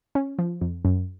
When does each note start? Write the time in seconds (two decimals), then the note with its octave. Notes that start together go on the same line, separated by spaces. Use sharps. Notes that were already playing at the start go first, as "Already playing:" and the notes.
0.15 C#4
0.39 F3
0.61 F2
0.85 F#2